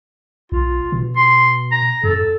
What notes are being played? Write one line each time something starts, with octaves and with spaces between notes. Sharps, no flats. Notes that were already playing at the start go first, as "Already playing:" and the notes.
B1 F4
B2
C6
A#5
F#2 A4